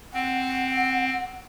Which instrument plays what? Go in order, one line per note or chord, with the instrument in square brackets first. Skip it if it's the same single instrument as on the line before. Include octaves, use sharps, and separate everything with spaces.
[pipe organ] C4 [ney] F#5